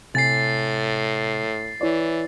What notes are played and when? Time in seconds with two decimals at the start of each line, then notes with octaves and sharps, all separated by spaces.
0.15 A2 C3 G#5 A6 C7
1.81 E3 E4 C#5 D5